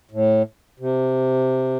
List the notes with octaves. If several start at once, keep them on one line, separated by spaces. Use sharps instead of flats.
A2
C3